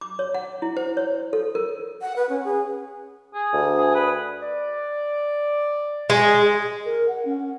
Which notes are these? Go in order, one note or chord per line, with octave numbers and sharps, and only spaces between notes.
D6
C#5
F#5
E4
C5
C#5
A4
A#4
F#5
B4
C#4
G#4
G#4
D2
G#4
B4
D5
G#3
A#4
F#5
C#4